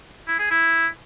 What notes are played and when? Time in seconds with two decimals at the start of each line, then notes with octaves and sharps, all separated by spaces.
0.28 E4
0.39 G#4
0.50 E4